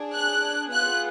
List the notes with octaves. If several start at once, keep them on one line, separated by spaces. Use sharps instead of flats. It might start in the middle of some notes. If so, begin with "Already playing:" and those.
Already playing: D4 G#4
F#6
B3 F4 G#4 F#6